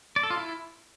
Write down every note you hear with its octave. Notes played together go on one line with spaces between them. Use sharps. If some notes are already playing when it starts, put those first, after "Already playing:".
D5
A4
F4
E4